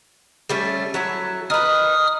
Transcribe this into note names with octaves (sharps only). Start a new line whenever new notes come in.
G3 A3 C#4
F#3 E4 A4
D#4 B4 D#6 F6